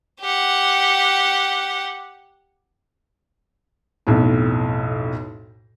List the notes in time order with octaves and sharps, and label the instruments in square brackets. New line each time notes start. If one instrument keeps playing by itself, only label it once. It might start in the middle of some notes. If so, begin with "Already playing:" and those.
[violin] G4 F#5
[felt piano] B1 F2 A2